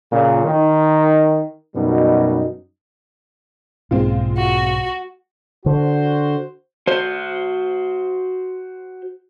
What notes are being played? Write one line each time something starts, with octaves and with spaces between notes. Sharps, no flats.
A#2 C#3
D#3
F#2 B2 G3 D#4
B1 G#2 G#3 A#3 C4 F4
F#4
D3 F#4 C5
F#4 C5